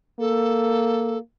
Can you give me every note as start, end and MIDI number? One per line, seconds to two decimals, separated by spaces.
0.20 1.18 58
0.20 1.18 69